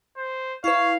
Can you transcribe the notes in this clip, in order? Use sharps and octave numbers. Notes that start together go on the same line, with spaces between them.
C5
E4 B4 C#5 F5